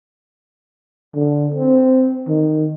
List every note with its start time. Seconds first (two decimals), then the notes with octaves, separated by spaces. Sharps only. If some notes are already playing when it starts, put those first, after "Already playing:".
1.15 D3
1.55 C4
2.28 D#3